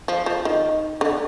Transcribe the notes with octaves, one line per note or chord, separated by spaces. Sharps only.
F3
F3
D#3
D3